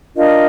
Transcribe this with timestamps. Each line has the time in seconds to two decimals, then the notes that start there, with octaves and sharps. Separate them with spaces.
0.16 D4 F4 A#4 D#5